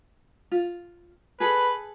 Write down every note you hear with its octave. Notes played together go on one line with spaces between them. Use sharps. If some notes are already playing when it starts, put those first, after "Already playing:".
F4
G#4 A4 B4